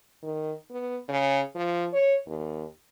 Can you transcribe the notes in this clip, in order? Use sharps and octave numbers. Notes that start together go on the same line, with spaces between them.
D#3
B3
C#3
F3
C#5
D#2